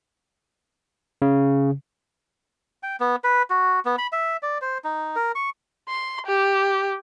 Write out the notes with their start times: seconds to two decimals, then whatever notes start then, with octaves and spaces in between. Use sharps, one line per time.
1.22 C#3
2.83 G5
3.00 B3
3.24 B4
3.50 F#4
3.85 B3
3.98 B5
4.12 E5
4.43 D5
4.61 C5
4.84 D#4
5.16 A#4
5.35 C#6
5.89 C6
6.27 G4